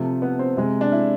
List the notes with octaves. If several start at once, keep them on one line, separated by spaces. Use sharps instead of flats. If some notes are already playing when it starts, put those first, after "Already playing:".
Already playing: C3 F3 A3
B3
C4
C3 G#3
D4
E4